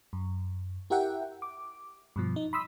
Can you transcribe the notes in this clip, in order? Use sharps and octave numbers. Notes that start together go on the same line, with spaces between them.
F#2
E4 G4 A#4 E5 F#5 G5
D6
G2 B2 F3
D#4
B5 C6 D#6 E6 B6